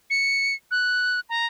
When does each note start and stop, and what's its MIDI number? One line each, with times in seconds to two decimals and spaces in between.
0.10 0.55 97
0.71 1.20 90
1.29 1.46 82